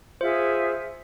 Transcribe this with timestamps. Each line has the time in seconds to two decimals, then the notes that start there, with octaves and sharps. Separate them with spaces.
0.21 F4 G#4 C5 E5